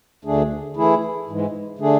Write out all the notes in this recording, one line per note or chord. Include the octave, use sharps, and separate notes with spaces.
D2 D3 A3 D4 G#4
E3 A3 E4 G#4
G#2 E3 G#3
D3 A3 D4 G#4